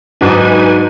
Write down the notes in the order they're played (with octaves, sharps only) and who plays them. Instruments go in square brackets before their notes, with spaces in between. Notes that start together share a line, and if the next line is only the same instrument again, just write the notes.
[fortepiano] G#2 D4 [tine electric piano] F#3 F#4 [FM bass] D#4 [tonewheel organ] B4 G#5